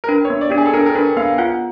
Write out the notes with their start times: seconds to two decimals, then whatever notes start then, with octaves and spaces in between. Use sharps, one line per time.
0.04 A#4
0.08 D4 B4
0.25 C#5
0.30 B3
0.41 D5
0.50 D4 G4
0.58 G#4
0.66 A4
0.74 D4 A#4
0.86 A#4
0.95 D4 B4
1.17 B3 F5
1.38 F4 F#5